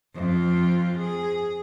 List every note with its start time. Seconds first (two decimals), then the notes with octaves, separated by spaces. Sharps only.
0.15 F2 F4
0.99 G#4